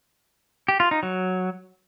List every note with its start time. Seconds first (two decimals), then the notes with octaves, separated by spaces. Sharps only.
0.68 G4
0.80 F4
0.91 D#4
1.03 F#3